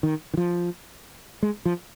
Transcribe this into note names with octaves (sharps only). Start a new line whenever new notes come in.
D#3
D#3
F3
G#3
F3